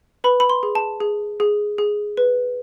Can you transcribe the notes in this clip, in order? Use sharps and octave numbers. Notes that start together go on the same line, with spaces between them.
B4 B5
B5
C6
G#4
A5
G#4
G#4
G#4
B4